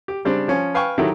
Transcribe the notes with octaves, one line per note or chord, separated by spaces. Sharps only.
G4
C#3 G3 C4 D4
F3 C#4
B4 F5 G5 G#5 C#6
D#3 F#3 E4 G4 A4